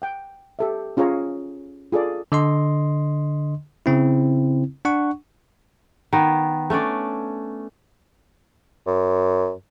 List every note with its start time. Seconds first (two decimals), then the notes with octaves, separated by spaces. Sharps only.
0.02 F#5 G5
0.59 G4 A4 E5
0.97 C#4 F4 G#4 C#5 A#5
1.92 F4 G#4 A4 D5
2.32 D3 D#5 C6
3.86 C#3 C4 E4
4.85 D4 F#5 C#6
6.13 D#3 B3
6.70 A3 C#4 D4 D5
8.87 F#2